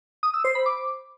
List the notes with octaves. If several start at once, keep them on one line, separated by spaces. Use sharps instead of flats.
D#6
E6
C5
B5
D6